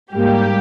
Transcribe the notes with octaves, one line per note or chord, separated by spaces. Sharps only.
G#2 G3 A#3 G4